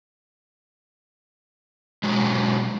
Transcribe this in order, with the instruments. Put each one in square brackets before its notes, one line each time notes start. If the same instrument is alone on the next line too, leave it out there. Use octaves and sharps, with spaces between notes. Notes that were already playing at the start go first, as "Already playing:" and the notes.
[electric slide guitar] B2 F#3 G#3